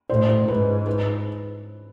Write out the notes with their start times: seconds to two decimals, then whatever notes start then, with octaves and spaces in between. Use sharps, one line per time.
0.10 A2 C5
0.29 C5
0.48 G#2 B4
0.87 B4